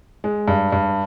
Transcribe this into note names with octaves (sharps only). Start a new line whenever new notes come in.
G#3
G2
G2